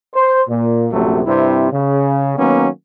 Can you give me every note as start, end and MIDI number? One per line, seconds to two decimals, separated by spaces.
0.15 0.42 72
0.49 0.87 46
0.92 1.22 34
0.92 1.22 42
0.92 1.22 48
0.92 1.22 54
0.92 1.22 57
1.26 1.69 43
1.26 1.69 48
1.26 1.69 60
1.26 1.69 64
1.71 2.35 49
2.38 2.69 51
2.38 2.69 54
2.38 2.69 58
2.38 2.69 59
2.38 2.69 61